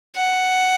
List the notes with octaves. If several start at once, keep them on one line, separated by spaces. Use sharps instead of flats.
F#5